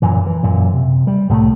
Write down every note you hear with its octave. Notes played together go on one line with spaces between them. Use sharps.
F#2 A#2 E3
E3
F#2 A#2
C3
G3
C2 A2 F#3 A3